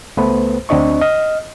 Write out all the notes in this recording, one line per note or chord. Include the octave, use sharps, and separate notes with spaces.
C#2 A3 B3 B4 C5
D2 C4 D4 D#5 C#6
D#5 F6